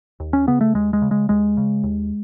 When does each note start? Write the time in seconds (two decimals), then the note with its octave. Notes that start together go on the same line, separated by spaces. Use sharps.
0.20 D#2
0.33 C#4
0.47 C#3 B3
0.61 A3
0.75 D#2 G#3
0.93 G#3
1.02 C#3
1.11 G#3
1.29 D#2 G#3
1.57 C#3
1.84 D#2